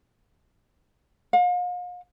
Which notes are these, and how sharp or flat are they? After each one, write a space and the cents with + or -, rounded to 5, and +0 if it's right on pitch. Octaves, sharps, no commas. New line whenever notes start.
F5 +40